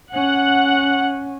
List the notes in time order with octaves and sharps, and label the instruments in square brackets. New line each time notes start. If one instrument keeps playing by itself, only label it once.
[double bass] C#4 [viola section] F#5